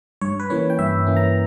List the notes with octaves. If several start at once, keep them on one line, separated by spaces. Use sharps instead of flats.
G2 C#5
B4
E3 A#3 C#4 C#5
G5
G2 E5
E3 A#3 C#4
A#5